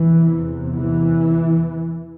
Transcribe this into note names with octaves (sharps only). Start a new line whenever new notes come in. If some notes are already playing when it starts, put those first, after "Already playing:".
Already playing: E2 C3 E3
E3